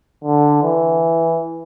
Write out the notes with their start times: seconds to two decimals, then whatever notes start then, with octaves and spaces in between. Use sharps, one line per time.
0.24 D3
0.63 E3